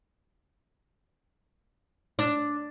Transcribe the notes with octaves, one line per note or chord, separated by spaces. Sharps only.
D4